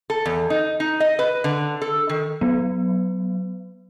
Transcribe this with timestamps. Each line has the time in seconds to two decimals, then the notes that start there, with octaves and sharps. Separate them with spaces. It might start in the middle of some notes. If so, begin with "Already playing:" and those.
0.10 A4
0.26 E2
0.50 D#4
0.80 D#4
1.00 D#5
1.19 B4
1.44 D3
1.82 A4
2.09 D#3
2.41 F#3 B3